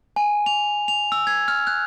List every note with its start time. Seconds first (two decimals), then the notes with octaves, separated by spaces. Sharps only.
0.16 G#5
0.46 F7
0.88 F7
1.12 E6
1.27 G#6
1.48 F6
1.67 F#6